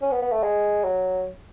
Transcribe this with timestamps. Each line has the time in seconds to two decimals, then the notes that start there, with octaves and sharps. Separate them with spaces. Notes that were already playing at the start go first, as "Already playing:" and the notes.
0.02 C#4
0.11 B3
0.22 B3
0.32 A3
0.43 G#3
0.84 F#3